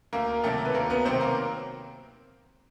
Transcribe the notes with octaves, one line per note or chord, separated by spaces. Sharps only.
D2 A#3 A#4
C3 D#3 F#3 A3 A4
B4
D2 A#3 A#4
B3 B4
C3 D#3 F#3 C4 C5
A#3 A#4